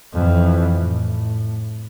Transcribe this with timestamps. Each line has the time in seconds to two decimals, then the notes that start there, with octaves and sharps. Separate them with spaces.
0.13 F2 E3
0.77 A2